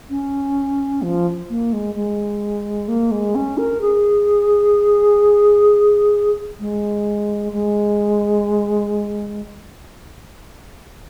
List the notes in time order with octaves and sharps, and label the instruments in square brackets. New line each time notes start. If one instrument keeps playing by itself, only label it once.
[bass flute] C#4
F3
A#3
G#3
G#3
A#3
G#3
C#4
A#4
G#4
G#3
G#3